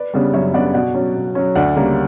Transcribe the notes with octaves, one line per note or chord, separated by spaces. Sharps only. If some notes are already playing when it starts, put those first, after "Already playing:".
Already playing: B4 D5
C#3 G3 B3 D4
F#2 C#5 E5
C#3 G3 B3 D4 D5 F#5
B2 D5 F#5
F#3 C#4
B2
F#3 C#4
D2 D5 F#5
C#3 G3 A#3